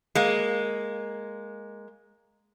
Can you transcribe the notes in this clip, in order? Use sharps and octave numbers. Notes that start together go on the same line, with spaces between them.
G#3 A#3